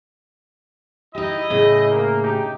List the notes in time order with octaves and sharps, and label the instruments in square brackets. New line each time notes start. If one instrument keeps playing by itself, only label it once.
[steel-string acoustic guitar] D#4 G4 [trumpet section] E4 D#5
[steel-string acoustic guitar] A2 C#3
[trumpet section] A#3
D4 D#4 G4